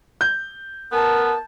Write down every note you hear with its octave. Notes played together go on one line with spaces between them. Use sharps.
G6
B3 A#4 A5